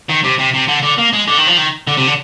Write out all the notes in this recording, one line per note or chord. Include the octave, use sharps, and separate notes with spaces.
D#3
C3
C3
C3
D3
D3
A#3
G#3
D3
D#3
F3
D#3
D3
C3
D3